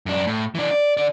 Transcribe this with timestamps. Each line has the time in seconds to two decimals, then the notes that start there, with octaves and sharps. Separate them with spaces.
0.06 F#2 D4
0.27 A2
0.55 E3 D4
0.71 D5
0.97 D3 D5